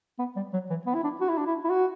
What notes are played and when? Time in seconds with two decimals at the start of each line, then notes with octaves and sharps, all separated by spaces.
0.19 B3
0.36 G3
0.53 F#3
0.70 E3
0.87 B3
0.95 E4
1.04 D4
1.21 F#4
1.29 E4
1.38 D4
1.46 E4
1.64 E4
1.70 F#4